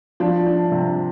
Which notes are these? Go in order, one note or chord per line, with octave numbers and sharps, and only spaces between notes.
F3 D4
D4
C3